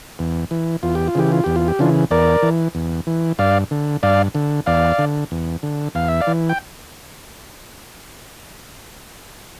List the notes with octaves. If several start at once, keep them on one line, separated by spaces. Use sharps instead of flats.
E2
E3
E2 F4
G4
F4
C#3 E3 G4
F4
E2 G4
F4
G4
C#3 E3 D4 F4
E2 A#4 D5
E3
E2
E3
G2 D5 F5
D3
G2 D5 F5
D3
E2 D5 F5
D3
E2
D3
E2 F5
E5
D5 F5
E3
G5